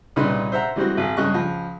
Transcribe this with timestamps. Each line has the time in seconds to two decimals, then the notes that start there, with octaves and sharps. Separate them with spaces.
0.16 C2 A#2 C#3 D#4 B4 C6
0.52 C5 E5 F#5 A#5
0.76 E3 G3 G#3 C4 F#4
0.97 G#1 G#4
1.17 G2 C#3 G#3 D#5 C#6 F#6
1.34 C#2 F3